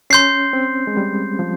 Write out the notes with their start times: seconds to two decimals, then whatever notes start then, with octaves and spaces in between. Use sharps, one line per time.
0.10 C#4 C6 G6 C7
0.53 C4
0.87 G#3
0.97 G3
1.39 F3